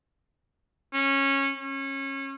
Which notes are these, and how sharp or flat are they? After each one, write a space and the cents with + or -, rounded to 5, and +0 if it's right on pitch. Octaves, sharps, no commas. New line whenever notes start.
C#4 -15
C#4 -25